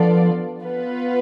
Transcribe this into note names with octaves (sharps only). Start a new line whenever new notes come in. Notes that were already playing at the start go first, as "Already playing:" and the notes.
Already playing: F3 B3 D4 F4 A4 D5
B3 F4 B4